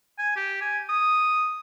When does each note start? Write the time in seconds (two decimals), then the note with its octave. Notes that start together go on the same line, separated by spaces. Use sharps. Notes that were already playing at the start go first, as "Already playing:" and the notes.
0.18 G#5
0.36 G4
0.61 G#5
0.89 D#6